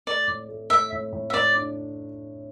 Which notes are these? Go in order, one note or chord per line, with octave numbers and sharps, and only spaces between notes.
A3 D5
A2
A3
A2 E5
A2
A2
E5
A2 D5
D4